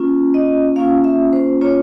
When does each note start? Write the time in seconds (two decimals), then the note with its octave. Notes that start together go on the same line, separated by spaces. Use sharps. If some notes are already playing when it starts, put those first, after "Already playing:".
Already playing: A#3 C#4 F4
0.34 D#5
0.76 A#3 C#4 F4 F5
1.04 E5
1.33 C5
1.61 A#3 C#4 F4 C#5